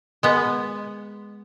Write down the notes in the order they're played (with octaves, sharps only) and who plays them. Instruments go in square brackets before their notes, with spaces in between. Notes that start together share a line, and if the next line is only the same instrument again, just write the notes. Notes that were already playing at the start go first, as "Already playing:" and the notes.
[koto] G#3 B3